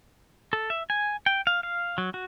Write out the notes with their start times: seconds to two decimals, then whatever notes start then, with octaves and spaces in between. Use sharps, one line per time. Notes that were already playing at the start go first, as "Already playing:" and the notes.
0.53 A4
0.70 E5
0.90 G#5
1.26 G5
1.47 F5
1.63 F5
1.98 F#3
2.14 F#4